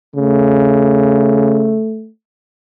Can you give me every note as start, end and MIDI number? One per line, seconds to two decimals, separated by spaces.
0.15 1.80 49
0.15 2.09 57